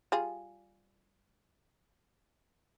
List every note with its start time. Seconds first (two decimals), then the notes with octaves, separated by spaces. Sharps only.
0.12 G3 F4 G#4